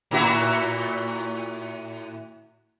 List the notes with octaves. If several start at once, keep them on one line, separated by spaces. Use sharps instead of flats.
A2 E4 F#4